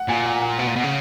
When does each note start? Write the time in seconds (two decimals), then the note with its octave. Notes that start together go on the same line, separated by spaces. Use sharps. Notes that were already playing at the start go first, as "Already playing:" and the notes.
Already playing: F#5
0.08 A#2 G#5
0.26 F#5
0.42 F#5
0.59 B2 F#5
0.67 A#2
0.75 B2 F#5
0.83 C#3